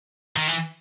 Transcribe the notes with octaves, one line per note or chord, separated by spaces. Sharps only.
D#3
E3